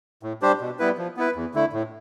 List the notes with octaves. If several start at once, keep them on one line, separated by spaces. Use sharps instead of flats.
A2
G3 D4 G4 C5
B2
G3 B3 E4 B4
F3
B3 E4 B4
E2
D3 A3 E4
A2